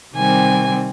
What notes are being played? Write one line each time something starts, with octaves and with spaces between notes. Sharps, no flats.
C3 D#3 G3 C4 G#5